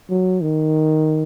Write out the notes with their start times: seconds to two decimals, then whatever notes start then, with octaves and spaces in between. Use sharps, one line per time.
0.10 F#3
0.42 D#3